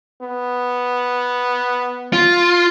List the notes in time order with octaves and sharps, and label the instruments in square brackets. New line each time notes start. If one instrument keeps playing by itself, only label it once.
[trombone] B3
[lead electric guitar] F4